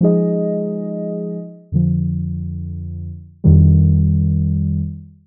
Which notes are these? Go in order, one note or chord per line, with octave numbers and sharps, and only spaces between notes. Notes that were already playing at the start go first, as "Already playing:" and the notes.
F3 G#3 D#4 G#4 D#5
F2 D3 F3
F2 D#3 G3